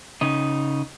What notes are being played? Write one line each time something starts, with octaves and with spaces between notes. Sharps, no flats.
C#3 D#4